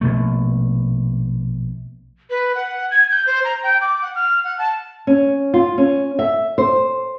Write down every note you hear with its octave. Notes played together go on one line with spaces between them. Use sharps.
A#1 B2 A3
B4
F#5
G#6
G6
C5
A#5
G5
D6
F#5
F6
F#5
A5
C#4
F4
C#4
E5
C5